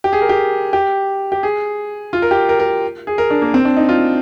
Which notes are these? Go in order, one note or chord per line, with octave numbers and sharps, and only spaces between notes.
G4
G#4
A#4
G4
G4
G4
G#4
F4
A#4
G4
A#4
A#4
G#4
A#4
D4
A#3
C4
D4
D#4
F4